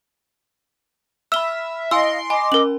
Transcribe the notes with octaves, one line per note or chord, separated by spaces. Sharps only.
E5 B5 E6 F6 G7
E4 D#5 F5 G#5 C6 E6 D7
D#5 G#5 B5 D6
C#4 A#4 F#7